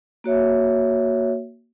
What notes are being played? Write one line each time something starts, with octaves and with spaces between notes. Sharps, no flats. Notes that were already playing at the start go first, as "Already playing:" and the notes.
A#3 F#4 C#5 E5